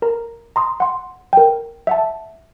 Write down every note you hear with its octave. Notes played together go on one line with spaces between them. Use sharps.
A#4 A#5
A#5 C6 D#6
F#5 C6
A#4 G5
E5 F#5 A5